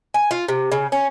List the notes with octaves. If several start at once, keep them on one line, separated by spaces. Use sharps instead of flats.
G#5
F4
C3
C#3
C#4